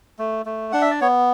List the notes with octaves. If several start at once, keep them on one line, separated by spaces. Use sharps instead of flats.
A3
A3
D4 F#5
E5
D5
B3 C#5